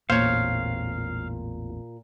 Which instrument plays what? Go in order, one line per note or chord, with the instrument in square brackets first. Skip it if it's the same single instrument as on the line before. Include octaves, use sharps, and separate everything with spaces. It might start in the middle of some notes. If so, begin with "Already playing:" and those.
[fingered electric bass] A1 E2 [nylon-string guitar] A#2 [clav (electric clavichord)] C5 C#5 [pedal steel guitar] F5